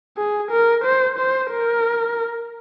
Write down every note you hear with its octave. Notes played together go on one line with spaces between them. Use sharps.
G#4
A#4
C5
C5
A#4